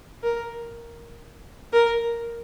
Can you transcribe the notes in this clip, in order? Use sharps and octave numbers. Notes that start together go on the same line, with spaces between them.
A#4
A#4